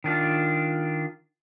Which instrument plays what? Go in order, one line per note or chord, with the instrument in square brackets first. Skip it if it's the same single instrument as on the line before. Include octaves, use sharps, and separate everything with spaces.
[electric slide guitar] D#3 D4 F4